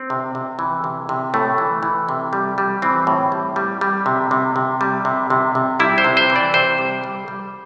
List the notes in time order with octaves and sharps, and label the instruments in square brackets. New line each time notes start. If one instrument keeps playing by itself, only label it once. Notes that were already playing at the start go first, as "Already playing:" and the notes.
Already playing: [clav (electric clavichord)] C4
C3
C3
E3
C3
C3
A2 A3
E3
E3
C3
G3
G3
E3 C4
A2
G3
G3
G3
C3
C3
C3
G3
C3
C3
C3
G3 E4
C5
C3
C5
E3
D5
C3 C5
G3
G3
G3